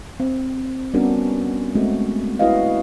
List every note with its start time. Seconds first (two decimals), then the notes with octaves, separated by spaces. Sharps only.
0.20 C4
0.94 G3 B3 C#4 D4 F#4 A#4
1.75 G#3 A3 C4 F#4
2.39 E4 F#4 B4 C#5 D#5 F5